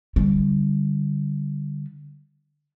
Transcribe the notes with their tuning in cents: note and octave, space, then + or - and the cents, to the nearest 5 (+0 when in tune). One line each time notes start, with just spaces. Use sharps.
D3 +0 G3 +0